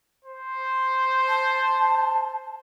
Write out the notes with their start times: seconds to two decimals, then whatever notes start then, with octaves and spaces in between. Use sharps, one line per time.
0.25 C5
1.28 A5